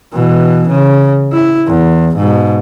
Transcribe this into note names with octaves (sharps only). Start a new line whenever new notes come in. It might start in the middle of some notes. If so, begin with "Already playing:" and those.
B2 E3
C#3
E4
E2
G#2 B2